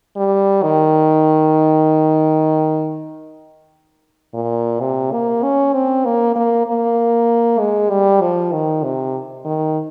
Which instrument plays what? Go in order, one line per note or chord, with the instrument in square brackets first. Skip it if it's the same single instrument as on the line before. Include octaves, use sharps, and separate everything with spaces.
[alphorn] G3
D#3
A#2
C3
A#3
C#4
C4
A#3
A#3
A#3
G#3
G3
F3
D#3
C3
D#3